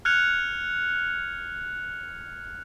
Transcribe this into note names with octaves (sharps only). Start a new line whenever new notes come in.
F6 F#6 G#6 C#7 F7